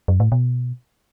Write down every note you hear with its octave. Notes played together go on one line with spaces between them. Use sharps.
F#2
A2
B2